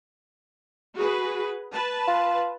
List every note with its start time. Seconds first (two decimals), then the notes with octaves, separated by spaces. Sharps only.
0.95 F#4 G#4 B4
1.72 B4 A5
2.08 F4